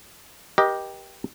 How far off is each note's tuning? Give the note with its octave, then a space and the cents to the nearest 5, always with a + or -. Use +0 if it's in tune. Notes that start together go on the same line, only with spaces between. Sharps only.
G4 +0 A#4 +45 D#5 +0